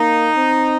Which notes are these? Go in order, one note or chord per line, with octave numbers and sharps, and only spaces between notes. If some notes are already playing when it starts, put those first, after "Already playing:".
Already playing: A#3 D#4
C4